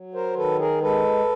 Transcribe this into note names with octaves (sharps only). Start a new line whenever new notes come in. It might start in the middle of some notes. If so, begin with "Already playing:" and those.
Already playing: F#3
A#4 C5
D#3 A4 B4
G#4 A#4
G#3 A4 B4